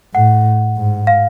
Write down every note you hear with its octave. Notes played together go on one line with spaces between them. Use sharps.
A2 F#5
G#2
F5